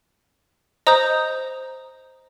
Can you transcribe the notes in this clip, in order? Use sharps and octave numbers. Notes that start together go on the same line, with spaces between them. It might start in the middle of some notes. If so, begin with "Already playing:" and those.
C5 D#5 A#5 D#6 G6